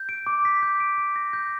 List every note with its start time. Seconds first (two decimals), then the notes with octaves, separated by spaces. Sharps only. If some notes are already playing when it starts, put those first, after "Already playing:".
Already playing: G6
0.09 D7
0.27 D6
0.45 B6
0.63 G6
0.80 D7
0.98 D6
1.16 A#6
1.33 G6